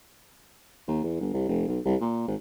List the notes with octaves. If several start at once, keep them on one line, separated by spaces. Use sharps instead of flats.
D#2
E2
G1
C2
F1
B1
C2
A#2
G#1